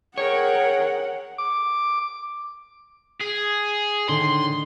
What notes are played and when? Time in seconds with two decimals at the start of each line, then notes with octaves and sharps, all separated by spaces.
0.18 G#4 A#4 C#5 F#5 G5
1.38 D6
3.20 G#4
4.09 A2 D3 D#3 C6